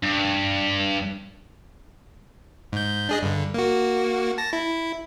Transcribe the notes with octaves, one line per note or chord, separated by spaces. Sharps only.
G2
G#2 G6
D4 G#4 D#5
G2 D3
A#3 F#4
A5 A#6
E4